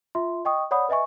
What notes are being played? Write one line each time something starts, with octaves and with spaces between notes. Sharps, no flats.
F4 E5 C6
D#5 G5 C#6 D#6
C#5 D5 F#5 B5 D#6
B4 D#5 E5 G#5 C#6